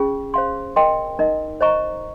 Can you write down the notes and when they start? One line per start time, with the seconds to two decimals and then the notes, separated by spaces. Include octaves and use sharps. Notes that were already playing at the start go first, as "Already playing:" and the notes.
Already playing: C#4 F4 G#4
0.34 C5 F5 C6
0.76 A#4 D#5 G5 C6
1.19 D#4 A#4 D#5
1.61 C5 D#5 A#5 C#6